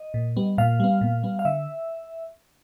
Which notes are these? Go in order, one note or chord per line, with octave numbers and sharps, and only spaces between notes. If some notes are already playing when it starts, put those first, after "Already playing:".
Already playing: D#5
A#2
G3 B3
A#2 F5
G3 B3
A#2
G3 B3
F5
D3 E5